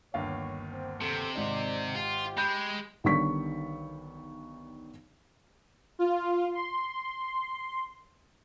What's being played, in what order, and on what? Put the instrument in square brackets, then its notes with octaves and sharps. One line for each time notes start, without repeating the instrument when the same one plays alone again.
[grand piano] G1 D#2 F5 [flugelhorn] C#5
[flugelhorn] C4
[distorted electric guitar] C3 [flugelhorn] A4
[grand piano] G#1 D#4 [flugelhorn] D5
[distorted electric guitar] F4 [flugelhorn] G4
[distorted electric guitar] G#3 [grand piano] B5 G6
[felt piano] B1 D3 D#3 G3 C#6 B6
[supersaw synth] F4
C6